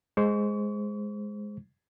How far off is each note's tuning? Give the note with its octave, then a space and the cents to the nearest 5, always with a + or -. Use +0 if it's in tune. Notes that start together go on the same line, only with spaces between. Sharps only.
G#3 +0 C5 +0 C#6 +40